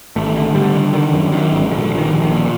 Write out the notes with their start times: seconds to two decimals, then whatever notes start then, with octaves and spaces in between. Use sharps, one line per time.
0.16 G#1 A3
0.36 D3
0.55 D3 G3
0.75 D3
0.93 D3 D#3
1.13 F#2
1.32 F#2 D#3
1.52 G#1
1.71 A#1 D3
1.91 A#1
1.98 D#3
2.11 A#1
2.24 D#3
2.30 A#2